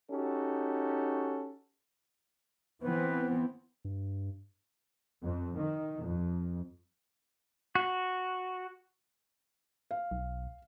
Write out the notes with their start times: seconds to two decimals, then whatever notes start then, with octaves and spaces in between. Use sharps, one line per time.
0.10 C#4 D#4 F#4 G4 A4
2.82 E3 B3 C4 B4
3.85 G2
5.25 F2
5.56 D#3
6.01 F2
7.75 F#4
9.91 F5
10.11 B1